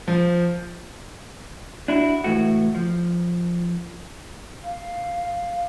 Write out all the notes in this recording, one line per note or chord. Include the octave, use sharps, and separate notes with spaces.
F3
D4 E4 F#4
C#2 A2 C3 E3 A3 F#4
F3
F5